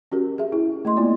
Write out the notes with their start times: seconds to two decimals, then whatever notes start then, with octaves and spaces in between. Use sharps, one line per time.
0.12 C#4 F#4 G4 A#4
0.38 G#4 E5
0.52 E4
0.85 A3 D#5 C6
0.97 A#3 B3 E4 F4 D5